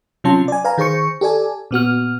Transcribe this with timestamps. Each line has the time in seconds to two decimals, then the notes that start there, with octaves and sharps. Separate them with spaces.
0.24 C3 F#3 C#4 F4 A5 C6
0.48 D5 G#5
0.64 B4 F5 G#5 A#5
0.78 D#3 G#4 C5 C#6 C#7
1.21 G4 A4 D5 G#5
1.71 A#2 B3 F#4 F6